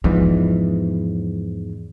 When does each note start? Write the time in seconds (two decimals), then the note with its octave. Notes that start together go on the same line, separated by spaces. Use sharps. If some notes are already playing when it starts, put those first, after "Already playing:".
0.04 E2 G#2 E3 F3